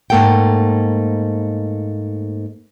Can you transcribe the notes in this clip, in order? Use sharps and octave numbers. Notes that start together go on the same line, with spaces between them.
G#2 A3 A#3 A4 F#5 G5